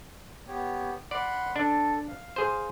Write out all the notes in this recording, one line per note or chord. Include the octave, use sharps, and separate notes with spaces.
B3 G4 C#5
D5 F#5 B5 C6
D4 A4
F5
G#4 C5